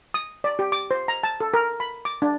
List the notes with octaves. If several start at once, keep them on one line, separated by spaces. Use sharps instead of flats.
D#6
D5
G4
D6
C5
A#5
A5
A4
A#4
B5
D6
D4